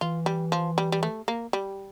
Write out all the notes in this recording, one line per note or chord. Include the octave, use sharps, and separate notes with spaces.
E3 F4
G3
F3
G3
G3
A3
A#3
G3